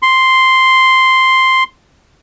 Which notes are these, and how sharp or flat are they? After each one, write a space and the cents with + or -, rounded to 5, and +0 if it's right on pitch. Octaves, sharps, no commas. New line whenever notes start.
C6 +0